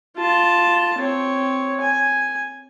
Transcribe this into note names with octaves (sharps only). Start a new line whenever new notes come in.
F4 A5
C4 C#5
G#5